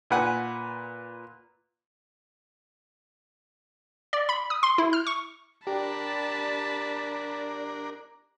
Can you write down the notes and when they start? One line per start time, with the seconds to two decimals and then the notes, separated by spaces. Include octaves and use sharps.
0.10 A#2 B4 F#5 G#5
4.13 D5
4.29 B5
4.50 D#6
4.63 C6
4.78 E4
4.93 F6
5.07 C#6
5.67 D4 G4 A#4 D5 A5 B5